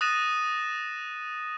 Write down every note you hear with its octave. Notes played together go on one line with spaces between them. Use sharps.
D#6 F#6 A6 A#6 D#7 E7